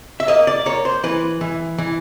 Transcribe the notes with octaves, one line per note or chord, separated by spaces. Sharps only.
E5
A#3 D#5
D5
A#3 C#5
C5
E3 B4
E3
E3